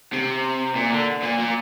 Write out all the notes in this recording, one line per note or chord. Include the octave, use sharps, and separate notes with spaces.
C3
A#2
D3
A#2
A#2